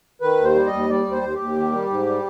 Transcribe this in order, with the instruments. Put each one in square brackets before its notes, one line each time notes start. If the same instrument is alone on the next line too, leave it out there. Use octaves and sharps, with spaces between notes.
[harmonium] D#3 B4
D#2
C5
G3
D#5
D#2
G3 D5
D#2 C5
D#2
D#2 G4
D#3
G3
G#2
G3